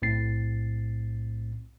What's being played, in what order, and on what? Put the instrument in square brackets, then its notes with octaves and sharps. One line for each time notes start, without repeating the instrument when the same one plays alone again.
[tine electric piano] B1 A2 C4 A6 C7